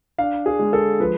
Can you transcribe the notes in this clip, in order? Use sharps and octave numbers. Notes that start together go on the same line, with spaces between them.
D4 F5
G#4
G#3
A4
F3 B4